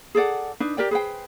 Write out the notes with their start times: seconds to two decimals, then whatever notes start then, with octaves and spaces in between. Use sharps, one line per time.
0.15 G#4 A4 D5 F#5
0.60 D4 D#4 B4
0.77 G4 A#4 D5 G5
0.91 G#4 B4 C5 G5